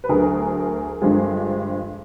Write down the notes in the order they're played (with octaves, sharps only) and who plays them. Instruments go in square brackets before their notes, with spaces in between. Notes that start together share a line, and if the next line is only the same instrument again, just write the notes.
[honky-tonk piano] B4
D2 D3 F#3 G#4 A#4
G2 D3 F3 G#3